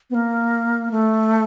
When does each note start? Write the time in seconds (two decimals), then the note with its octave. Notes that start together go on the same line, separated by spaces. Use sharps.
0.10 B3
0.15 A#3
0.91 A3